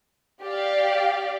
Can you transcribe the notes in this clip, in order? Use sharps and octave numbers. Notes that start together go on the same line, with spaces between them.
G4 D5 F5